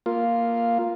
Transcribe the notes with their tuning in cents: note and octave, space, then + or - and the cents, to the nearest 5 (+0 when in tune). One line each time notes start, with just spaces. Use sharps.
A#3 +0 F4 +0